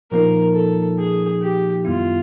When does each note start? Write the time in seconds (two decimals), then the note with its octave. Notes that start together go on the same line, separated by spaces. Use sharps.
0.11 A#2 F3 A#3 D#4 A#4
0.54 A4
0.99 G#4
1.41 G4
1.85 F#2 D#3 G3 B3 E4 F4